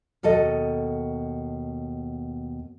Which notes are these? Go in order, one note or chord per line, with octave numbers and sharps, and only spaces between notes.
D#2 B2 A4 D#5